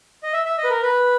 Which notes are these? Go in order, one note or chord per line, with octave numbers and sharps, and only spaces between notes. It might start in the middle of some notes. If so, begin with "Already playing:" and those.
D#5
E5
E5
D#5
B4
A#4
B4